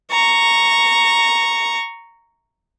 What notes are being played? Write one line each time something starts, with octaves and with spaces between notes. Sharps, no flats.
A#5 C#6